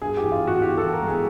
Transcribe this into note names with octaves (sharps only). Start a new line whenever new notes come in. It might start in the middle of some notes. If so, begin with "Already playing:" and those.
G2 G#4
E3 G4
F4
E3 F#4
E3 G4
A4
E3
A#4
G#3 G#4